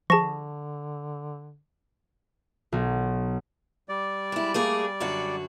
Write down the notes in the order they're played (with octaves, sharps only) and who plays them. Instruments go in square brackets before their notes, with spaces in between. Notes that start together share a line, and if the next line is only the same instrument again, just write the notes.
[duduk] D3 [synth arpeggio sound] F3 G#4 [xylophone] A5 A#6 [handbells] C#6
[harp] B1
[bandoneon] G3 D5
[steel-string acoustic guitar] G#3 E4
A3 A#3 G#4
F#2 D3 F#4